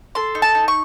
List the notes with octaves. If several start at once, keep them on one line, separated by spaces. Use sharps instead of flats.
A4 C6
D#4
A5
D#4
C#6